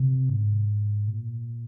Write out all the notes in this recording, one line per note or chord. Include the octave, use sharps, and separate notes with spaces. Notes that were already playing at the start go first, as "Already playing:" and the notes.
Already playing: C3
G#2
A#2